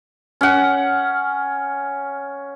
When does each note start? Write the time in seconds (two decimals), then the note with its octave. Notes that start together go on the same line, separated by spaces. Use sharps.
0.41 C#4 F#5